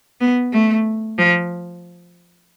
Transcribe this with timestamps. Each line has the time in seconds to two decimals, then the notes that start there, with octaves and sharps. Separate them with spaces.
0.20 B3
0.53 A3
1.18 F3